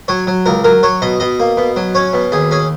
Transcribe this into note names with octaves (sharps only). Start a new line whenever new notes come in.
F#3 C#5
F#3
C#2 A#4
F#3 A#4
F#3 C#5
B2 D#5
B2 D#5
A#3
B2
F#3
C#4 C#5
B2
D#2 G#4
C#4 G#4